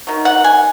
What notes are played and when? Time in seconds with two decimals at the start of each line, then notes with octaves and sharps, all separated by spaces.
0.07 D#3 F#3
0.25 F#5
0.44 G#5